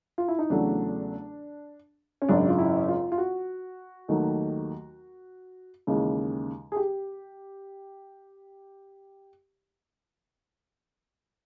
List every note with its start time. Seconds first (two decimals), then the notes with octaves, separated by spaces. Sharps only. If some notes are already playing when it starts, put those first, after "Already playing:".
0.18 F4
0.28 E4
0.39 D#4
0.50 E2 C#3 F#3 A3 D4
2.22 C#4
2.29 G#1 F#2 C#3 D4
2.49 F4
2.59 E4
2.88 F4
3.12 F4
3.18 F#4
4.08 D#2 D#3 F#3 A3
5.87 D#2 C#3 E3 G#3
6.72 G#4
6.76 G4